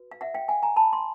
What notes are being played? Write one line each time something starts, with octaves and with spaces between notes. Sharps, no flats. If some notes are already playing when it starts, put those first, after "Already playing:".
Already playing: F#4 B4
F5
E5 F#5
F5 G5
F#5 G#5
G#5 A#5
A5 B5
C6